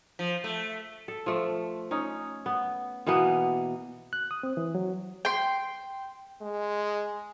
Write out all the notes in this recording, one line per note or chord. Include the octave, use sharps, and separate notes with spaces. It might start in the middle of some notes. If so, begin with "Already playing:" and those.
F3
A3
A4
F3 A3
C#4 D#4
B3
B2 E3 A#3 B3
F#6
D#6
C4
E3
F#3
G5 C6
G#3